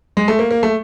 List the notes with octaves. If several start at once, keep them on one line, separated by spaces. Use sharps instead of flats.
G#3
A3
A#3
A#3
A3